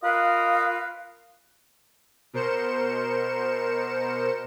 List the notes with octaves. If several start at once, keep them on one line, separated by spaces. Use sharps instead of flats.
F4 A#4 B4 D#5 F5
B2 A#4 C5 C#7 E7